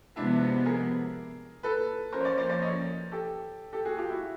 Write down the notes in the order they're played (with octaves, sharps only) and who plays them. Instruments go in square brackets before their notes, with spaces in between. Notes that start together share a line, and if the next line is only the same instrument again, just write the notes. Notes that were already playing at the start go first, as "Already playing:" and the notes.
[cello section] C3 F3 G#3 B3 [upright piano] D4 E4
[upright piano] G#4 A#4
A4 B4
[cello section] F3 A#3 C#4 [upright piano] A#4 C5
[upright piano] C#5
C5 D5
C5 D5
C5 D5
C#5 D#5
G4 A4
G4 A4
F#4 G#4
F4 G4
E4 F#4